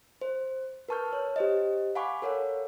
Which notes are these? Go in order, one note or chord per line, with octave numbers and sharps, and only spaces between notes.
C5
A#4 B4 A5 C#6 F6 G6
C#5
G4 C5 D#5
F5 F#5 G#5 B5 C#6 D6
A4 A#4 C#5 F5 F#5